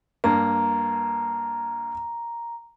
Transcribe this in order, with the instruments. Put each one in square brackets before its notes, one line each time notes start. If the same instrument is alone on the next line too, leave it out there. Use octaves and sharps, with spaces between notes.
[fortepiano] G2 A#3 [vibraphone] A#5